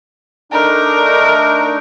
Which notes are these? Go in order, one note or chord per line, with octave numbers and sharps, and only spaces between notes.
A3 D4 D#4 A#4